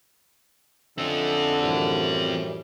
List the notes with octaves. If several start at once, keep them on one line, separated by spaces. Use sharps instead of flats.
D3 C4 C#4 F4 A4 D#5 E5
F#2 A2 E3 G3